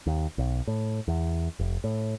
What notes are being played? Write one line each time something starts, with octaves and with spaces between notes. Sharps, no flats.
D#2
B1
A2
E2
F1
A2